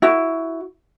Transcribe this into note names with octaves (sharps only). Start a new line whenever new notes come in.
E4 F#4